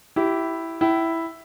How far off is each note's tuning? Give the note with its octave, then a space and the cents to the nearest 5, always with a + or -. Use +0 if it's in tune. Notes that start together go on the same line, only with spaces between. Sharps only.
E4 +0 G4 -20
E4 +0 G5 -35